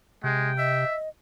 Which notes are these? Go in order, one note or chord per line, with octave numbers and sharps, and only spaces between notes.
C3 G#3 G5
D#5 E5